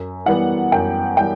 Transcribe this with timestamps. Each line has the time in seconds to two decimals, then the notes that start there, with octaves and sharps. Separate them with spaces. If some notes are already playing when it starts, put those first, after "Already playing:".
Already playing: F#2
0.26 E3 G3 B3 F#5
0.72 F#2 G5
1.17 E3 G3 G5